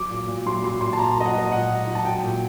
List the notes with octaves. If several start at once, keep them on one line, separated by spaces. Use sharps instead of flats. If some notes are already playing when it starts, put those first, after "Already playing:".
Already playing: F#3 D6
A#2
A#2
F#3 C6
F#3 C6
A#2 C6
A5
A#2 A#5
A5
F#3 D#5
F#5
F#3 D#5
A#2 F#5
A#2
F#3
A5
F#3 G5
A#2